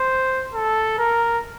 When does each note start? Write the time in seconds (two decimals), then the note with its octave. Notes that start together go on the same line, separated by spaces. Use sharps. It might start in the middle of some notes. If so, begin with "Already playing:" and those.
Already playing: C5
0.54 A4
0.98 A#4